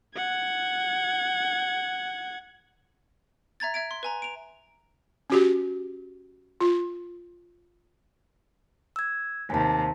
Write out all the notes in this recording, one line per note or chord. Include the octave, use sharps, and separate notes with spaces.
F#5 G#6
E5 A#5 G#6 A6
E5 G#6 D7
C6
B4 G#5 A#5
D7 F7
C#4 F#4 G4
F4
E6 G#6
D#2 C3 G#5 A5